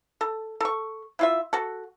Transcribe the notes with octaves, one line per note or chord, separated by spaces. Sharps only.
A4
A4 C#6
E4 F4 E5
F#4 A4